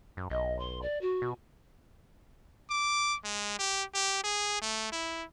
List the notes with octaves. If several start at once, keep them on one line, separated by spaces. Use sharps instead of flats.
F#2
B1 D#5
C6
D5
F#4
B2
D6
G#3
G4
G4
G#4
A3
E4